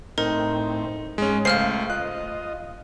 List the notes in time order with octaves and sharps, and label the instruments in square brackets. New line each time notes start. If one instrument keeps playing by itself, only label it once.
[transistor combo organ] A2 C4 [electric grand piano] D#4 [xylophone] A#4
[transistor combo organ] G#2 [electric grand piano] G#3 C#4
[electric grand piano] C#2 C5 [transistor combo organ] A3 [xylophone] F5 F6 C7
[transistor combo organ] F4 D#5 [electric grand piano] F#6